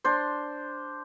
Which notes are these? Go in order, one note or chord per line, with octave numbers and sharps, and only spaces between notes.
D4 C5